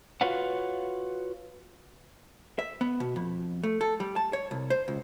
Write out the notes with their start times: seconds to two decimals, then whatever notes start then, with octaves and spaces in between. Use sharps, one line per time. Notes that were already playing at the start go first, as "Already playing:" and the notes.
0.21 F4 F#4 B4 C#5 F5 F#5
2.59 E5
2.81 B3
3.00 B2
3.16 F2
3.63 A3
3.81 A4
4.00 G3
4.16 A5
4.33 C#5
4.51 C2
4.70 C5
4.88 C#2